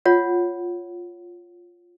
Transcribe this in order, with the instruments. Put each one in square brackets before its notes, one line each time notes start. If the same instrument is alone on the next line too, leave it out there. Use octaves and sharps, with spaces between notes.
[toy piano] F4 C#5 F#5